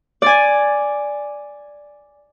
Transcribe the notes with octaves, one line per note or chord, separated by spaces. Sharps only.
D5 G#5